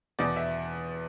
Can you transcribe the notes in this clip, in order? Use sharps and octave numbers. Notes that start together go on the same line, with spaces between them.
E2 B2 D5
E5